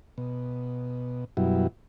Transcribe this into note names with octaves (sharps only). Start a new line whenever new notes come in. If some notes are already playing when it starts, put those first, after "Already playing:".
B2
F#2 B2 F#3 G3 E4